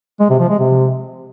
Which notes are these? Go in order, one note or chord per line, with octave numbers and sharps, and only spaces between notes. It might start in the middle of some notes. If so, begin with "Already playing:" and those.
G#3
C3
F3
G#3
C3